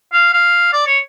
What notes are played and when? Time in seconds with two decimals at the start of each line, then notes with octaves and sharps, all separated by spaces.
0.13 F5
0.33 F5
0.73 D5
0.86 C#5